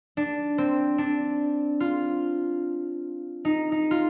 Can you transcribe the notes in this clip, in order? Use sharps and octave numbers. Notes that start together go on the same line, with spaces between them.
D4
C4
D4
F4
D#4
D#4
F4